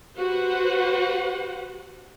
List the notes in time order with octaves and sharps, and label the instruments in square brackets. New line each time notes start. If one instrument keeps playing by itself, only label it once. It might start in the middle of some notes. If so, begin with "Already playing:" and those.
[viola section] F#4 G4 B4 C5 F#5